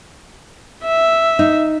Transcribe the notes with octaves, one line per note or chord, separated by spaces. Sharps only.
E5
D#4